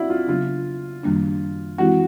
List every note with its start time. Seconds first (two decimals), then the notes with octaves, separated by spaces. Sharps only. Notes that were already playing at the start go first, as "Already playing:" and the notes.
Already playing: D4 E4 F#4
0.10 F4
0.28 C#3 F#3 B3 D4 F4
1.03 F#2 D#3 G3 A#3 D4
1.78 E3 G#3 C4 E4 F#4 G4